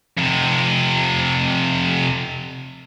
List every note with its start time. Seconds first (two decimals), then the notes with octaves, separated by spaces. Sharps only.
0.17 F2 C3